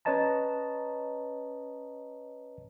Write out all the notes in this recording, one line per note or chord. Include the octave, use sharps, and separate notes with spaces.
C#4 B4 C#5 D#5 A5 A#5